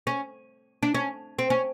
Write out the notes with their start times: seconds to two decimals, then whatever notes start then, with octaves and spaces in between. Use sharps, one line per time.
0.07 C#4
0.83 D4
0.94 C#4
1.39 C4
1.50 C#4